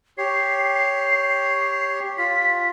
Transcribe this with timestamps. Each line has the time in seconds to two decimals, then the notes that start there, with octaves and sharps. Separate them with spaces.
0.18 G4 C#5 C7
2.18 F4 B6